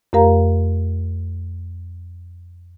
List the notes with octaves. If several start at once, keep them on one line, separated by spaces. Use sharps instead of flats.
F2 A3 G4 A#4 F5 A#5